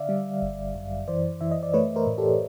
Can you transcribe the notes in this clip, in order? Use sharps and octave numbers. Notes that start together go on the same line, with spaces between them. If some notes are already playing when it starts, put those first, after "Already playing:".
Already playing: D3 D5 E5 F5
G3
G1
F#2
E3 C5 D5
E3 E5
D#5
D5
A3 B4 C#5
A#4 C5
A2
G4 A4